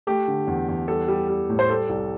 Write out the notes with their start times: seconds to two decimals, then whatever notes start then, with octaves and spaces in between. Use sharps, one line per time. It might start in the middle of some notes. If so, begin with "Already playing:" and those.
0.07 A3 G4
0.28 D3
0.47 E2
0.68 E2
0.88 G3 A4
1.08 G3
1.28 G3
1.50 A2
1.59 C5
1.69 G3 A4
1.89 C2